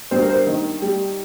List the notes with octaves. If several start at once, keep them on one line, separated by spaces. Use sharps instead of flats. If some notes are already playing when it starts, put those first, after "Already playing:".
G2 C5
A#4
C5
D#3
G3